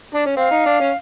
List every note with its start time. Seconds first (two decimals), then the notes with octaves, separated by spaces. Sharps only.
0.14 D4
0.26 C#4
0.37 C4 F5
0.51 D#4
0.66 D4
0.80 C#4